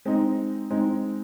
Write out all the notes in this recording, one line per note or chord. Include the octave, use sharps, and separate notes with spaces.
G#3 C4 D#4
G#3 C4 D#4